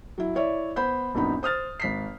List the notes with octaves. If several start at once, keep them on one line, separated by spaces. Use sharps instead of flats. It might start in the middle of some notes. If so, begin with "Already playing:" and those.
F#3 E4
E4 C#5 D5 E5
B3 C5 B5 G6
A#1 F#2 B3 D#4 B5
C5 D#6 F6 A6
G#1 B6 C7